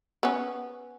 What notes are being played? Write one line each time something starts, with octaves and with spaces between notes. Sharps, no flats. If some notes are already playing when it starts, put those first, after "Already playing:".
B3 C#4